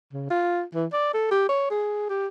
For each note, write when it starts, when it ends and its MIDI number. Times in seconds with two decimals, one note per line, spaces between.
0.13 0.25 49
0.30 0.63 65
0.75 0.86 52
0.93 1.13 74
1.14 1.27 69
1.31 1.46 67
1.49 1.69 73
1.71 2.06 68
2.09 2.27 67